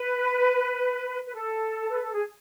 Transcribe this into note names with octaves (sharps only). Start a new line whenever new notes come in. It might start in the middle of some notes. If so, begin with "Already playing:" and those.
Already playing: B4
B4
A4
B4
A4
G#4